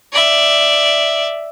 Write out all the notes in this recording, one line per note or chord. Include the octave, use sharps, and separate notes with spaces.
D5 E5